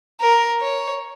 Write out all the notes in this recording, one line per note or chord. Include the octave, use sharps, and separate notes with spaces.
A#4
C#5